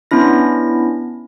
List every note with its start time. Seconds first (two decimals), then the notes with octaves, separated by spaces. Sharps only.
0.11 B3 C#4 D4 E4 A#6